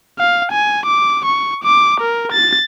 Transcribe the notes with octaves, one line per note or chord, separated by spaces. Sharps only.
F5
G#5
D6
C#6
D6
A#4
A6